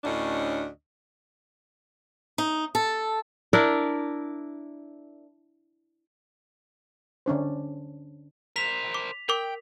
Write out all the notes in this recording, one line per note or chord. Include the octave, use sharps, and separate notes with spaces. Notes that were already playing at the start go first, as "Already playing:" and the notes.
D2 A2 C#4 D4 D#5
D#4
A4
D4 E4 A#4
D3 C#4 D4 C5
A#4 C5 B6 F7
D6
A#4 G5 D6